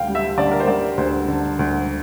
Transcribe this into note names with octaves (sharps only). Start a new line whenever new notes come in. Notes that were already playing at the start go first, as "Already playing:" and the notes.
Already playing: D2 D3 F5 G5
G3
E5
D3 D5
A#4
C5
G3 D5
D2 C5
D3
D2